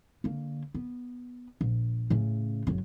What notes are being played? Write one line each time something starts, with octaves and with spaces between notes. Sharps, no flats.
D3 A#3
B3
A#1
A2 C#3
F#1 F#3